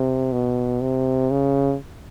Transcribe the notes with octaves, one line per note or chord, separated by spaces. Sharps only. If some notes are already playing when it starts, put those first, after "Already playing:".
Already playing: C3
B2
C3
C#3